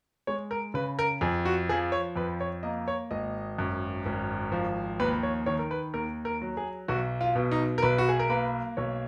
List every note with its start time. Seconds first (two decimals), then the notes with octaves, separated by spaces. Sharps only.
0.27 G#3 C#5
0.51 A#4
0.74 C#3 B4
0.99 A#4
1.21 F2 G#4
1.45 F#4
1.69 F3 G#4
1.92 C#5
2.16 F2 B4
2.40 C#5
2.63 A#3 D#5
2.88 C#5
3.11 G#1 D#5
3.59 F#2
4.06 G#1
4.52 F3
4.99 D#2 B4
5.23 C#5
5.46 D#3 C#5
5.59 A#4
5.71 B4
5.94 D#2 A#4
6.25 A#4
6.42 F#3
6.57 G#4
6.88 B1 F#4
7.21 F4
7.35 B2
7.51 D#4
7.78 A#4
7.82 B1 B4
7.98 F#4
8.09 G#4
8.19 A#4
8.30 A#3 B4
8.77 B1 C#5